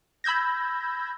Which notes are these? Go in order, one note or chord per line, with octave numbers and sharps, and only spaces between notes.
B5 E6 G6 G#6 A#6